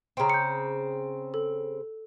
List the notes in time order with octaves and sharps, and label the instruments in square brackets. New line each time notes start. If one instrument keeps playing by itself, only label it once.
[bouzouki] C#3 C4 [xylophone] G5 A#5
[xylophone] G6 C#7
A4